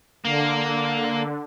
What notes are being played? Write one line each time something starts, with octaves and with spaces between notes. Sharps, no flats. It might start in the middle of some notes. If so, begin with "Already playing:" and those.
D3 A#3